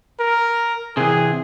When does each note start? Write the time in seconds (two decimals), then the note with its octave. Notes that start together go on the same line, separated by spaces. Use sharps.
0.20 A#4
0.97 C3 E3 G#4